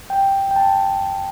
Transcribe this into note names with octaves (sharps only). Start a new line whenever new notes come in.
G5
G5
A5